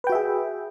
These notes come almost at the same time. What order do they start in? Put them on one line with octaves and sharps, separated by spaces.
B4 G5 F#4 E5 G#4